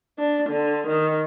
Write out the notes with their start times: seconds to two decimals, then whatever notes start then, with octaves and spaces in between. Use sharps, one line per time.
0.19 D4
0.50 D3
0.88 D#3